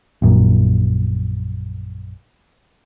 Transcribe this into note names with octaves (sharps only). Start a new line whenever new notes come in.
A#1 F#2 A#2